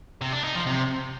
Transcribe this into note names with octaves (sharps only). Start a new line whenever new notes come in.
C3
D4
D#4
F3
C3